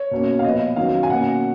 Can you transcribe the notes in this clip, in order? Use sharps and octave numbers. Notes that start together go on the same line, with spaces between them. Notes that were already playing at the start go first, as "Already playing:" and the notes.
Already playing: C#5
B2 A#3 C#4
F5
A#2 F3 B3 D#5
D#3 F#3 C#4 F5
G#5
B2 A#3 C#4 F#5